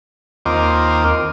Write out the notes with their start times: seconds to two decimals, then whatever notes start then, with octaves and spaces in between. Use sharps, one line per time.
0.46 D#2 C4 F4 A#4 D#5 D6